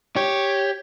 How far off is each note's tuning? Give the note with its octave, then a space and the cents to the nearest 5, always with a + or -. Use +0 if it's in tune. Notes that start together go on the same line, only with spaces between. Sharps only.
G4 +0 C#5 +0